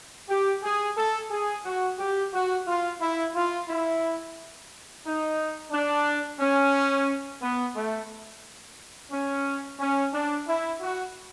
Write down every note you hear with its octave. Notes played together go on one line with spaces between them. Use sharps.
G4
G#4
A4
G#4
F#4
G4
F#4
F4
E4
F4
E4
D#4
D4
C#4
B3
A3
C#4
C#4
D4
E4
F#4